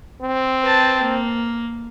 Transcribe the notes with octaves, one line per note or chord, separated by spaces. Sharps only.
C4
B4 A5
A#3